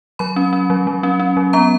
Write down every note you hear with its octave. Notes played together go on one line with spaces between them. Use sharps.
F#3 B5
C#4
C#4
F#3
F#3
C#4
C#4
F#3
B3 A#5